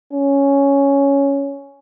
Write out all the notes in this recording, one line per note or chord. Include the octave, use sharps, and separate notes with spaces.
C#4